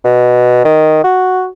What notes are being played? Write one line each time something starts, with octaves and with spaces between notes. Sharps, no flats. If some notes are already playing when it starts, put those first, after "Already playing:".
B2
D#3
F#4